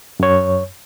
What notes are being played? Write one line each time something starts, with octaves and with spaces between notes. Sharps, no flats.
F#2 C#5